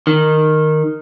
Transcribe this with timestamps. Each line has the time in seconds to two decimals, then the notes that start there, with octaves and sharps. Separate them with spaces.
0.07 D#3